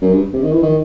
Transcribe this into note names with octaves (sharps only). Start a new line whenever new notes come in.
F#2
G2
C3
D#3
E3
D#3